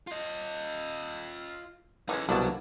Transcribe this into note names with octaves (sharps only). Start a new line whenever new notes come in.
F4 D#5
E3 G#3 C#4 D#4 A4
C2 B2 D3 F#3 A#3 A5